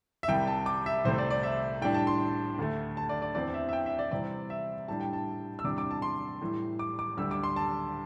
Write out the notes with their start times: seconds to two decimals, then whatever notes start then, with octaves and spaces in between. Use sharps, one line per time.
0.23 E5
0.28 C2 C3 G3 G5
0.47 A5
0.66 D6
0.86 E5
1.05 C2 C3 A3 C4 C5
1.18 D5
1.30 D5
1.43 E5
1.81 A2 G3 D4 G5
1.94 A5
2.07 C6
2.58 D2 D3 A3
2.97 A5
3.09 D5
3.22 D5
3.35 E2 E3 C4 D5
3.54 E5
3.69 E5
3.73 G5
3.86 E5
3.99 D5
4.11 C3 E3 G3 C4 D5
4.50 E5
4.88 A2 G3 D4 A5
5.01 G5
5.13 A5
5.59 E6
5.64 E2 C3 G3 D4 D6
5.78 D6
5.91 A5
6.02 C6
6.41 A2 E3 G3
6.79 D6
6.99 D6
7.17 D2 D3 G3 E6
7.31 D6
7.43 C6
7.56 A5